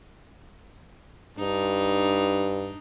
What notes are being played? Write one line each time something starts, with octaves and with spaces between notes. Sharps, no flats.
G2 D4 D#4